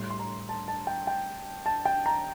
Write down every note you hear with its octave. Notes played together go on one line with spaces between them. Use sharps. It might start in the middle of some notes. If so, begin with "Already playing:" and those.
Already playing: A2 G3 C6
C6
A#5
A5
A5
G5
G5
A5
G5
A#5